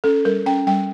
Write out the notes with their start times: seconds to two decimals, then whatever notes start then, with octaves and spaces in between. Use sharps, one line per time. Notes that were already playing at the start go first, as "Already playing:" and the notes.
0.04 C#4 A4
0.25 G3 A#4
0.46 C#4 G5
0.67 G3 G5